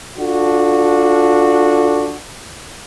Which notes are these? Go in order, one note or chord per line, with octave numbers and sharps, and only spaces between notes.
D4 F4 F#4 A4